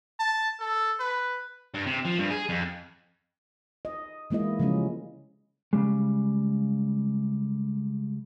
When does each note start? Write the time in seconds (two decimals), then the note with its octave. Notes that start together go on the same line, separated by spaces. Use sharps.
0.19 A5
0.60 A4
1.00 B4
1.74 G2
1.86 C3
2.05 F3
2.18 G2
2.30 G#4
2.49 F2
3.85 D#5
4.30 E3 G#3 A#3 E4 D#5
4.60 C#3 F3 G3 G#3 C#4
5.73 C#3 G3 G#3